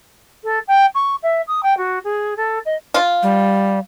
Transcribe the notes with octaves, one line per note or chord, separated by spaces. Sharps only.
A4
G5
C#6
E5
D#6
G5
F#4
G#4
A4
D#5
F4
G3